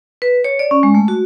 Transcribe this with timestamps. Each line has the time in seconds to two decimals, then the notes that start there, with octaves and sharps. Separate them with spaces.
0.22 B4
0.44 C#5
0.59 D5
0.71 C#4
0.83 G#3
0.94 A3
1.08 F#4